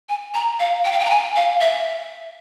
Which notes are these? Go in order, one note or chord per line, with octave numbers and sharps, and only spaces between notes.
G#5
A#5
F5
G5
F5
G5
A#5
G#5
F5
E5